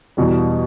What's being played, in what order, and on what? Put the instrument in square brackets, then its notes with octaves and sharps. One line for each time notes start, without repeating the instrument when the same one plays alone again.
[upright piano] E2 B2 G3